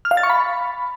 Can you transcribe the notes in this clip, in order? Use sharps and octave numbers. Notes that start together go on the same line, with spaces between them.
F6
F5
A6
C#6
B5